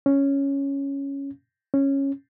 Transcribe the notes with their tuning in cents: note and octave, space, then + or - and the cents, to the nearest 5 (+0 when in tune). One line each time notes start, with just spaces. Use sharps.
C#4 +0
C#4 -10